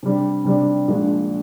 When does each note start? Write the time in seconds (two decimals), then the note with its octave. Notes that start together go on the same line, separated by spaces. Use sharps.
0.03 C3 G3 D4
0.45 C3 G3 D4
0.88 A#1 A#2 G#3 D4